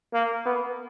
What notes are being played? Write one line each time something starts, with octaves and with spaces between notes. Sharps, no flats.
A#3
B3